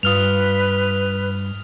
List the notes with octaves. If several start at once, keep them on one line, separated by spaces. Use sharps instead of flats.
G2 F4 B4 D#6 F6 F7